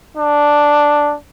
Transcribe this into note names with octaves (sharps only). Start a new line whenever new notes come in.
D4